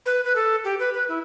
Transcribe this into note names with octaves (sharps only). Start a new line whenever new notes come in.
B4
B4
A4
G4
B4
B4
E4